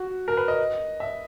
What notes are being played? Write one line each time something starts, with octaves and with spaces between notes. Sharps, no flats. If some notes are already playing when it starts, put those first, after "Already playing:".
Already playing: F#4
A#4
B4
D#5
E5